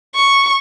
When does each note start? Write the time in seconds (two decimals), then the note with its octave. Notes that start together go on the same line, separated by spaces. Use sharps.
0.15 C#6